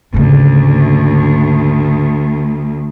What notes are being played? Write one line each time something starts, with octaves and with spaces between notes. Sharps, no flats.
D2 G#2 C#3